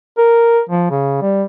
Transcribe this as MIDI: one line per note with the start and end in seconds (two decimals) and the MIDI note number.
0.18 0.61 70
0.70 0.86 53
0.91 1.19 49
1.22 1.44 55